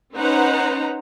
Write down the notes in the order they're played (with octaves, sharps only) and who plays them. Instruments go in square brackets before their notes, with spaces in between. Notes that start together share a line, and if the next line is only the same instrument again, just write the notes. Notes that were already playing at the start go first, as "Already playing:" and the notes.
[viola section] C#4 D#4 B4 C5 F#5 A#5